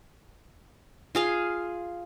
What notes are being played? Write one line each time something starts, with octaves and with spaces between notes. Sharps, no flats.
F4 G#4 F5